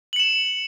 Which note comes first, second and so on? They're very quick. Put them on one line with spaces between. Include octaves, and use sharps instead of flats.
F#7 C#7 E7